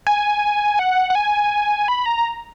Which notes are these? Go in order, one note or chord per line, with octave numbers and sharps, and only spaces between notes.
G#5
F#5
F#5
G#5
B5
A#5